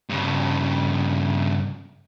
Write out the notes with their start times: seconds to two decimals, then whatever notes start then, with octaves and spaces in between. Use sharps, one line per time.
0.09 G2 C#3